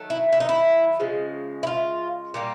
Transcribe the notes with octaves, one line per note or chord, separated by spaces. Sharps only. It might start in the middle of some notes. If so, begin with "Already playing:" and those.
Already playing: D#3 F#3 A3
E4
E4
D#4
E4
C#3 F3 G#3
E4
F4
A#2 G3 A#3